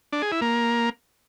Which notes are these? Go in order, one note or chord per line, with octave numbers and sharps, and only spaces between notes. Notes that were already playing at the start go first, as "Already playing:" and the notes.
D4
G#4
E4
A#3